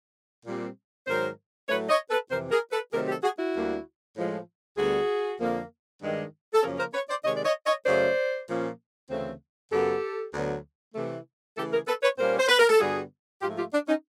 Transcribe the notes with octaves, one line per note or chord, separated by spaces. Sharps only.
A#2 G3 C4
G#2 D#3 F#3 A#4 C5
A2 F#3 A3 B4 C#5
C#5 D#5
A4 B4
F2 C3 E3 A#4 C5
G#4 A#4
A4 B4
C3 D#3 F#3 A3 C4 G#4 A#4
G4 A4
F#4 G#4
E4 F#4
D2 D3 G3 A#3
A2 F3 G#3
D2 D3 G3 B3 F#4 G#4
F2 D3 F3 A#3
G2 D#3 G#3
A4
F#2 C#3 F3 A#3 C#4 G#4 A#4
A#4 C5
B4 C#5
C5 D5
C3 D#3 G#3 C#5 D#5
D5
C#5 D#5
C#5 D#5
F#2 C#3 F#3 A3 C#4 C5 D5
A#2 F3 A#3 C#4
D2 C#3 E3 A3 C4
F#2 C#3 F#3 B3 G4 A4
D2 D3 F#3 B3
C3 E3 A3
C#3 E3 A3 G4 A4
G#4 A#4
A4 B4
B4 C#5
A#2 G3 A#3 C#4 A#4 C5
C5
B4
A#4
A4
G2 D3 G3 B3 F#4 G#4
G#2 F3 A3 F4 G4
F4 G4
D4
C#4 D#4